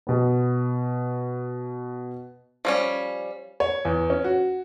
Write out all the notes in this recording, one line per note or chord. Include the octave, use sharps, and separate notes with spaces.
B2 B3
F3 G3 C#4
C#5
E2
C#4
F#4